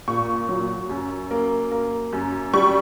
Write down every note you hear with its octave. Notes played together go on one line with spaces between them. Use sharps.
A#2 C#6
F#3
F#2
A#3
A#3
F#2
G3 C#6